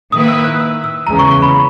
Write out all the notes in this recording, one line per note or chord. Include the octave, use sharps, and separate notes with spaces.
D#3 A#3 E4 B4 D#6
E6
F#6
E6
E6
E2 C#3 G#3 A#5
C#6
C#6
B5